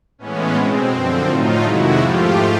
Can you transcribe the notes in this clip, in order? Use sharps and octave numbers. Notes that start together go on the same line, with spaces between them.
A2 E3 G#3 B3 C#4
B2 G#3 C4
F#2 D3 F3 C4
A2 F#3 A3 D#4 F4
F2 C3 D#3 G#3 E4 F#4
G#2 F3 A3 F4 G4